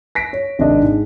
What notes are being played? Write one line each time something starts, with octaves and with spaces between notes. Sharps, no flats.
A#6 B6 D7
C#5
G#1 C3 D4 D#5
G#2